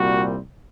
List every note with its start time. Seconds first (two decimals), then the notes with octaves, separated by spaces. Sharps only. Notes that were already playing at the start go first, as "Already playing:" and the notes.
Already playing: C2 A#2 G3 C4 F#4